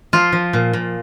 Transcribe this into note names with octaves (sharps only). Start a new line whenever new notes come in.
F3 F4
F3
A#2
A#2